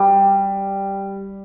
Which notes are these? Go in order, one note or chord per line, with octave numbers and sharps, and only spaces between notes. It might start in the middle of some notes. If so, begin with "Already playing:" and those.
Already playing: G3